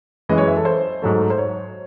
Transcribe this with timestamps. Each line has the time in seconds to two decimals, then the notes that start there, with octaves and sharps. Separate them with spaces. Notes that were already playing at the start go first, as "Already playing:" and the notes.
0.29 F#2 E3 G#3 D#5
0.38 C#5
0.47 E5
0.56 A4
0.65 C5
1.02 G#2 F#3 A3
1.30 C5
1.38 C#5